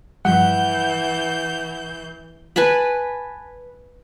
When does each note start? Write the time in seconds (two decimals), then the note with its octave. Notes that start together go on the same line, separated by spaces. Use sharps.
0.25 G2 E3 F3 G3 F#5 G6
2.56 B4 G#5 A5 B5